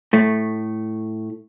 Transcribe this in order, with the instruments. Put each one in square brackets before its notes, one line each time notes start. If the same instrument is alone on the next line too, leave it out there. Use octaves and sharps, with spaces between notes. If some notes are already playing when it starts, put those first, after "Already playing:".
[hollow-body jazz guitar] A2 A3